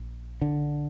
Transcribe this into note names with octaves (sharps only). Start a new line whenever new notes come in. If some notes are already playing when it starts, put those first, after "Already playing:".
Already playing: A#1
D3